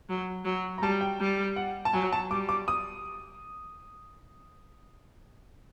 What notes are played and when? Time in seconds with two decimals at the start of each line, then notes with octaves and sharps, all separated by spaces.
0.09 F#3
0.45 F#3
0.78 A#5
0.82 G3 A5
1.01 G5
1.20 G3
1.56 F#5
1.85 A5
1.93 F#3 G#5
2.12 A5
2.31 G3 D6
2.49 D6
2.68 D#6